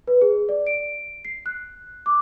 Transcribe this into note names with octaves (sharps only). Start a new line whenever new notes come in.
B4
G#4
D5
D7
C7
F#6
D6